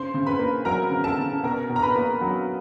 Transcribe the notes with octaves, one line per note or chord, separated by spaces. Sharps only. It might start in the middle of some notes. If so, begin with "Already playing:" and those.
Already playing: C#3 C5 C6
C#3
B4 B5
A#3
F#3 A#4 A#5
C#3
A4 A5
C#3
B2 A#4 A#5
B2
A#5
B4 B5
A#3
F#3